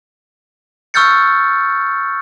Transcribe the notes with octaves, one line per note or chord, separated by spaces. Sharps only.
C#6 E6 F6 G6 A6 C#7